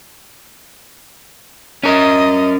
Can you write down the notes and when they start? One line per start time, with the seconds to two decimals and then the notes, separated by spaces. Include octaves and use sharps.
1.83 C#4 A#4 D#5